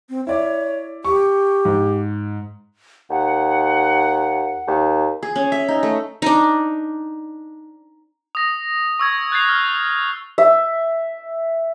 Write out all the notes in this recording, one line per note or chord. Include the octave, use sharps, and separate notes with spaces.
C4
E4 C#5 D5
G4 C#6
G#2
D#2 F#5
D#2
G#4
C#4
E5
D#4
A3
D4 D#4
D#6 A#6
C#6 E6 G#6
F#6 G6 A6 C7 F7
F6
E5